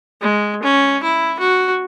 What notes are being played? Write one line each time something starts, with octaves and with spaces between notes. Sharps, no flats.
G#3
C#4
E4
F#4